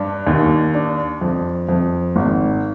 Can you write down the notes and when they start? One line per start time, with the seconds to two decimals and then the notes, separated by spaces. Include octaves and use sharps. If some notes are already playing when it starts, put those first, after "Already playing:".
Already playing: G2 D4
0.26 D#2
0.75 D4
1.21 F2
1.69 F2
2.16 G#1